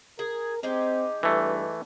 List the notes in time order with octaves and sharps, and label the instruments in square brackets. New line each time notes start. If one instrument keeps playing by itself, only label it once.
[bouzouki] G#4 [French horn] A#4
[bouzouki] G#3 D#4 G4 [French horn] C4
[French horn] G2 [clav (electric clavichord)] E3 A3